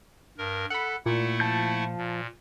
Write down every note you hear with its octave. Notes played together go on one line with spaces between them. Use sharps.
G2 A#4
A4 F#5 B5
A#2 A3 E4 F#5
F3 A5 G6
A#2